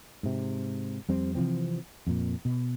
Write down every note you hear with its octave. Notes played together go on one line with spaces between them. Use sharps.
G#2 C3
F2 G3 C4
C3 E3 F3 C4
F2 A#2
B2